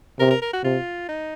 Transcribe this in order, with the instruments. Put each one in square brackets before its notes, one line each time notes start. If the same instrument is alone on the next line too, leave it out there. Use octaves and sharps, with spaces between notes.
[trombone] C3 [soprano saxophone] A#4
[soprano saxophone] A#4
A#4
F#4
[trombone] C3 [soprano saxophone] F4
[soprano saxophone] D#4